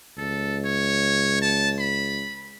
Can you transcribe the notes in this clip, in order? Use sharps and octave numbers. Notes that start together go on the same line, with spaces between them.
C#2 A4
C#5
A5
B5